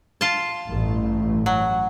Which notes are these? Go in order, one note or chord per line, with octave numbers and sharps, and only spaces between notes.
F4 A5
A1 G2 A3
F#3